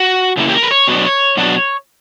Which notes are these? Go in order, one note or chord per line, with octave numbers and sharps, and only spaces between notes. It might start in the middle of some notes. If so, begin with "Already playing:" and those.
Already playing: F#4
C#3 E3 A#3 E4
G4
A#4
B4
C#5
B2 F#3 B3 D4
B2 F#3 B3 D4